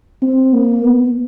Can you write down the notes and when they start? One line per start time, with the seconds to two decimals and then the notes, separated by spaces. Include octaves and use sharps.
0.22 C4
0.53 A#3
0.83 B3